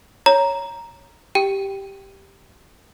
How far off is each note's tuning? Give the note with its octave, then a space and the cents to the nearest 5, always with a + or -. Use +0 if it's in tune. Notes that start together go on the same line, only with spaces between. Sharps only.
C#5 +0 A#5 +0
G4 +0 G5 -5